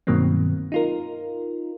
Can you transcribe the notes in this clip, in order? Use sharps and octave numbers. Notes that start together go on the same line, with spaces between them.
G2 B2 D#3 F#3 A#3 C4
D#4 F4 A#4